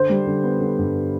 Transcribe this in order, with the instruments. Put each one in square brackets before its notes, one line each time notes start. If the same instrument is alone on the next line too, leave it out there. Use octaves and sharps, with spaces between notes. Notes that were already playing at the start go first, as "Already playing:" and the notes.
Already playing: [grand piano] D3 [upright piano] C5
[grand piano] G3
D3
B3
D3
G2